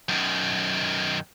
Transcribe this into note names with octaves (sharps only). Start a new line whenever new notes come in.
F#2 D#3